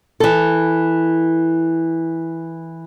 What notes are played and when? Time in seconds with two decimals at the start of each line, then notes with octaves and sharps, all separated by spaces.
0.20 E3 A4